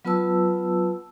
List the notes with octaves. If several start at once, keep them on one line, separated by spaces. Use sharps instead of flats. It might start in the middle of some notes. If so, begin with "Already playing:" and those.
F#3 B3 F4 B4 A5 E6